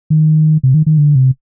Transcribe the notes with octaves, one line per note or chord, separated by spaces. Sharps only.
D#3
C3
D#3
D#3
D3
C3